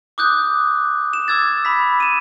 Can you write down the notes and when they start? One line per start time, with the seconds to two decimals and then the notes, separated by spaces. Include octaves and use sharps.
0.18 D6 D#6 F#6 G6
1.13 E7
1.28 D6 E6 G#6 A6
1.65 B5 B6
2.00 D#7 E7